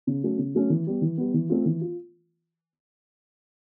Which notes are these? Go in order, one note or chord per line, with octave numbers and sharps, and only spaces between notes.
C#3
F#3 A3 C#4
C#3
F#3 A3 C#4
E3
G3 B3
E3
G3 B3
E3
A3 C4 F4
E3
F4